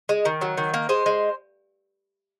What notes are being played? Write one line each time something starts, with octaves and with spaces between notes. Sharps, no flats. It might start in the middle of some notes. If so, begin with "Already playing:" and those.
G#3
D#3
F#3
D#3
A#3
G#3 C5
G#3